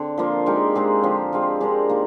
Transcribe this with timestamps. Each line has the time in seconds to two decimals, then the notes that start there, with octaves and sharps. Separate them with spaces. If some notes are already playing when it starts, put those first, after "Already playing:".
Already playing: D3 C4
0.18 F3 A#3 F4 C5
0.46 G#3 D#4 G4 A#4
0.75 G#3 C4 D#4 G#4
1.03 D3 F3 C4 G4
1.33 G#3 C4 F4
1.60 G#3 D4 G4 A#4
1.89 D#3 A#3